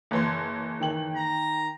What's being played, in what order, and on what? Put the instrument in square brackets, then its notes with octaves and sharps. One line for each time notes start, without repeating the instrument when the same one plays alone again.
[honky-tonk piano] F#1 E3 C6
[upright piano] D#3 G5 F#7
[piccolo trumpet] A#5